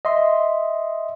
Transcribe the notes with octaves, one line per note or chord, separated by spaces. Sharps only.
D#5 E5 C6